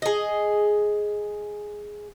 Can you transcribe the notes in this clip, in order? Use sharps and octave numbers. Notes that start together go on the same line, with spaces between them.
G#4 D#5